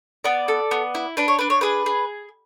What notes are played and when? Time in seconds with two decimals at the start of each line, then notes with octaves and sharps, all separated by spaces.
0.24 B3 D5
0.48 A4
0.71 B3
0.95 E4
1.17 D4 B4
1.28 C#5
1.39 D4 B4
1.50 C#5
1.61 G#4 B4
1.86 G#4